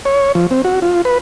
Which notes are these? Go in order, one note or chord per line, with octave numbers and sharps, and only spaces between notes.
C#5
F3
C4
F#4
F4
B4